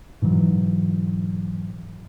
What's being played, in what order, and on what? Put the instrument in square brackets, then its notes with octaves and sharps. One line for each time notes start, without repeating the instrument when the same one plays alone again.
[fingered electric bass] G#2 B2 E3 F#3